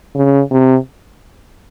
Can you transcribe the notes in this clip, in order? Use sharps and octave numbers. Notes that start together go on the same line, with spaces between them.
C#3
C3